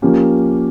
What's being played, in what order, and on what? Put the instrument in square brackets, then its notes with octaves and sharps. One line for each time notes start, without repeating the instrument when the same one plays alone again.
[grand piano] F3 A#3 C#4 G4